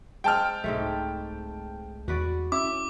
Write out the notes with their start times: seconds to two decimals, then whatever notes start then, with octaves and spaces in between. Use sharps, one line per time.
0.24 G#3 C4 G5 A5 F6
0.64 C2 G#2 G#3 A3
2.08 E2 F#4 B4 D5
2.52 C#4 E4 D6